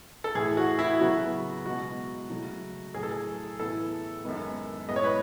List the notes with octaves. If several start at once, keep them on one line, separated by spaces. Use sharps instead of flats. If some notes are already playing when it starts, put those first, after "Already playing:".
A4
A2 E3 A3 G#4
F#4
E4
C#3 F#3 B3 F#4
B2 G#3 B3 F#4
C#3 F#3 A3
A2 F#3 A3 G#4
A4
G#4
A2 E3 B3 A4
F#2 D#3 G#3 B3
A2 G#3 B3 D#5
C#5
B4